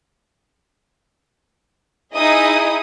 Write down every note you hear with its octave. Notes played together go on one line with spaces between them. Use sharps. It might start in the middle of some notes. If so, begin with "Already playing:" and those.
D#4 E4 G#4 D#5 D#6